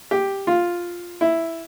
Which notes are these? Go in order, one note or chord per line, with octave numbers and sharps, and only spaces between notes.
G4
F4
E4